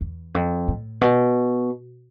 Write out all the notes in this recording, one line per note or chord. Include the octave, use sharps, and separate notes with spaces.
E2
F2
A2
B2